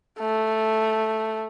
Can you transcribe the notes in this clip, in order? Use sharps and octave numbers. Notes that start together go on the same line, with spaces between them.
A3